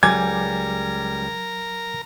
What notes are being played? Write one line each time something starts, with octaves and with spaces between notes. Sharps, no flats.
C#2 F#3 G3 A#4 G#5 D6 G#6